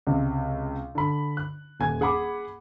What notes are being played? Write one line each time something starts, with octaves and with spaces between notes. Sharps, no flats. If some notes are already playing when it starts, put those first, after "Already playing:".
C#2 C3
D3 B5
F#6
D#1 G#5 G#6
G#4 F#5 G#5 B5 D6